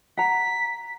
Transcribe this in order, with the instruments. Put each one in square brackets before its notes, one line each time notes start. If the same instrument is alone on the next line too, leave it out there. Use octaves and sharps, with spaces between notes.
[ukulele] F#5 A#5 [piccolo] B6